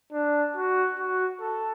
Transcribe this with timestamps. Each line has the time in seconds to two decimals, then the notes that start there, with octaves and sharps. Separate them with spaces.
0.13 D4
0.56 F#4
0.99 F#4
1.40 A4